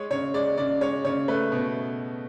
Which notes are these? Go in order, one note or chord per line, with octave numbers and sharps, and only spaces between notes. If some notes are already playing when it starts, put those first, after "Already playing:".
Already playing: G#3 C#5
C#3 C#5
G#3 D5
C#3 D5
G#3 C#5
C#3 C#5
A3 B4
B2